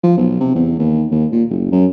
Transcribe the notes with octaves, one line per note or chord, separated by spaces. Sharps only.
F3
B1
C3
E2
D#2
D#2
A#2
F#1
F#2